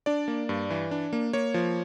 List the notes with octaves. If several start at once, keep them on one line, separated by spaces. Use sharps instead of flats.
D4 D5
A#3
G2
E3
D4
A#3
A#3 C#5
F3